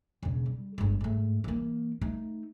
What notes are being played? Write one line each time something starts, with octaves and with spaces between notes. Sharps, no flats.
E1 C#3
G3
G1 G#3
G#2 A3
E3 A#3
A3 D#4